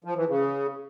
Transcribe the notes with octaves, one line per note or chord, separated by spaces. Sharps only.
F3
E3
C#3